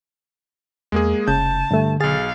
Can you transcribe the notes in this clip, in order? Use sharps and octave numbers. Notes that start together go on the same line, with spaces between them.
E2 G#3 A#3 G#4
F1 C#3 A5 G6
G2 D3 A3
B1 G#4 F5 A6